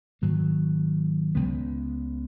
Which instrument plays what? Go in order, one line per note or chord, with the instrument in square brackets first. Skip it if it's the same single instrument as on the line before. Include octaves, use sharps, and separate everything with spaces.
[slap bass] G#2 D#3 F#3 A#3
C#2 C#3 G#3 B3